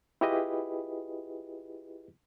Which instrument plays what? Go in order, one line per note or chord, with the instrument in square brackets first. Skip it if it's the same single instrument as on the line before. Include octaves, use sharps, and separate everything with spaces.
[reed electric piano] E4 F4 G4 G#4 B4 D#5